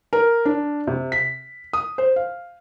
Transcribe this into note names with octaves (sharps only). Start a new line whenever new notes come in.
A#4
D4
C3
B6
D#6
C5
F5